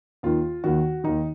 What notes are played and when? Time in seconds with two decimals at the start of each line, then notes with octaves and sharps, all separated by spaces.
0.23 D#2 D#3 F4
0.64 D#2 D#3 F#4
1.04 D#2 D#3 D#4